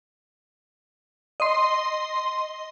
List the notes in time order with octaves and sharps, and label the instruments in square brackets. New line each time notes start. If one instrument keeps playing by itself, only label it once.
[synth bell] D#5 C6